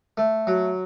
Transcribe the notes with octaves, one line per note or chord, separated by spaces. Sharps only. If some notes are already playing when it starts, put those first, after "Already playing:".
A3
F#3